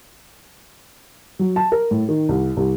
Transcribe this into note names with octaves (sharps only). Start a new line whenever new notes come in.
F#3
A5
A#4
A2
D#3
C2
C2